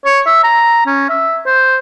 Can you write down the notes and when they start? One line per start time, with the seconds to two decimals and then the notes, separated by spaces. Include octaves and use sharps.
0.05 C#5
0.26 E5
0.44 A#5
0.86 C#4
1.10 E5
1.46 C5